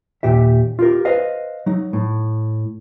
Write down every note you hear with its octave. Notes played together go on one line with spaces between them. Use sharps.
D#2 A#2 G4 E5
F4 G4 A#4
B4 C5 D#5 F5
F#3 D#4
A2